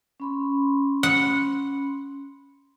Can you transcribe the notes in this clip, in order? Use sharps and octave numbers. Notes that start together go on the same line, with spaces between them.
C#4 B5 C6
F#5